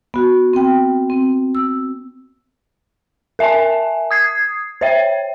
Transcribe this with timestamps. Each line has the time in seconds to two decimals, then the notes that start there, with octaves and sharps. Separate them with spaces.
0.14 B3 F#4
0.53 C4 G5
1.10 C4
1.55 E6
3.39 A#4 E5 G#5 A5
4.11 D#6 G#6 C7
4.81 C5 C#5 E5 G5